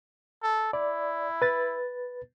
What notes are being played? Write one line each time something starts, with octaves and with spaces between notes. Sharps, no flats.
A4
E4 D5
B4 A6